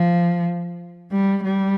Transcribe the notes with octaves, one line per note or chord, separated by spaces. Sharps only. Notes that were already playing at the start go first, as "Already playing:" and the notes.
Already playing: F3
G3
G3